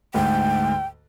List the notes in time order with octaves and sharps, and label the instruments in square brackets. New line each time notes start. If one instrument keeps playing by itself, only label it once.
[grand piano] D2 G#2 [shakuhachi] G5